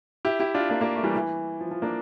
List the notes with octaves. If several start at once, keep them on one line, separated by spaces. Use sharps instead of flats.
E4 G4
E4 G4
D4 F4
A#3 D4
A#3 D4
A3
E3 G3
E3
F3
F3
A#3 D4